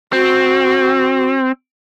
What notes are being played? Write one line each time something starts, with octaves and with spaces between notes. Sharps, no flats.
C4 F#4